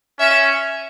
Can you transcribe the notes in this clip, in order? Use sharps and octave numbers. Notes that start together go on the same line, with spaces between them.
C#4 E5